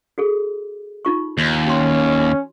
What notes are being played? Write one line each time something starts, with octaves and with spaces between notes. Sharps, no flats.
F#4 G#4 A4
D#4 F4 C#6
D#2
C#4 F#4 A#5 C6